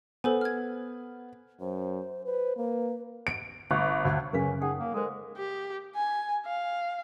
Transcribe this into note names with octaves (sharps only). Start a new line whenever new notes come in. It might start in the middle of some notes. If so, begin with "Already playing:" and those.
B3 A4 C5 G#5
F6 G#6
F#2 C5
B4 C5
A#3 B4
D7
G1
D2
F#2 C#3 C#4 A#4 B4 F5
D#4 G#4 F#5 G5
A#3
G#3 A4 A#4 C5
G4
G#5
F5